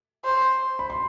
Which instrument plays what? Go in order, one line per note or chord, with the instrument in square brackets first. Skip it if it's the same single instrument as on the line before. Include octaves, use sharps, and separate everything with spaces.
[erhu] C5
[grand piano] B5
C6